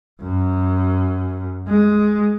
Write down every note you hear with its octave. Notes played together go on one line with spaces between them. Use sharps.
F#2
G#3